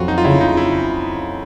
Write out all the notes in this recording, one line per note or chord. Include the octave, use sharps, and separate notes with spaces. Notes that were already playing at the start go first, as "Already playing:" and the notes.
Already playing: F2 F#3 F4 F#4
D#4
F4
C#3 E4
D#4
E4